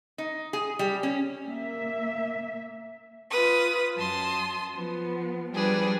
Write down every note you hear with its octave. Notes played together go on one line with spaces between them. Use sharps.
D#4
G#4
G3
C#4
A#3 E5
F4 B4 D#6
F#2 A5 C6 D#6
F3 B3
F3 G3 D4 G#4 B4